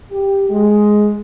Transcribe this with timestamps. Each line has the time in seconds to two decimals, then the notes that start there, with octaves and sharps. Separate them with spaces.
0.11 G4
0.49 G#3